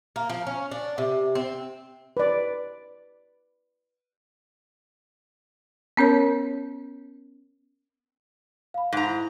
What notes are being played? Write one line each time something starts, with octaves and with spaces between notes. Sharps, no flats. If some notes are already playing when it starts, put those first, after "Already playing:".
A#3
F3
C#4
D4
C3
C4
B4 D5
B3 C#4 A#4 C#5
F5 B5
G#2 A#5
E4